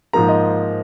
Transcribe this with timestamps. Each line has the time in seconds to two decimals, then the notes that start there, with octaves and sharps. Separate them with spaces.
0.13 G#2 F3 A#3 A#5
0.29 D#5